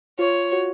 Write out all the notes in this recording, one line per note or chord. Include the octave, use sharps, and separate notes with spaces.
F4 C#5
F#4